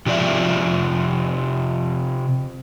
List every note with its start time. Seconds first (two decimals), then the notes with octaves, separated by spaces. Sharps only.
0.06 C3 F3 D5 E5